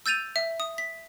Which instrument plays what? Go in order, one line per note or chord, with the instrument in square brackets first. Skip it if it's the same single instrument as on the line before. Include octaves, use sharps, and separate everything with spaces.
[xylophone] E6 G6 A6 D#7 F7
E5
D#6
B6